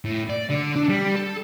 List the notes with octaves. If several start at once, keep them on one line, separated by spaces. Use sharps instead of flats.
A2
D5
D3 D5
D4
G3
A4